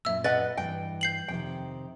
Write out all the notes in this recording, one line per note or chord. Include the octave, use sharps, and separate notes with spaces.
F#2 A#2 E5 E6
B4 D#5 F#5 A6
G2 E3 G5
G6 C7 F#7
F2 C3 D#3 G5